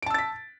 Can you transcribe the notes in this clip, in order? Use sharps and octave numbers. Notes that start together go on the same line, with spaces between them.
A5 E6 A6 B6 D7